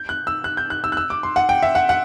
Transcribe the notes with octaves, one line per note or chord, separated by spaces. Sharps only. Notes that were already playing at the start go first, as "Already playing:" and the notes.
Already playing: G6
F#6
E6
F#6
G6
F#6
E6
F#6
E6
D6
C6
F#5
G5
E5
F#5
F#5